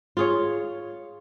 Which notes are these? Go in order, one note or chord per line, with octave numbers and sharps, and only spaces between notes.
F4 G#4 C#5